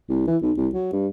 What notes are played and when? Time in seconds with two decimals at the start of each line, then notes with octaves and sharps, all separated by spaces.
0.09 C2
0.27 E3
0.42 B1
0.57 C2
0.74 F#3
0.93 G2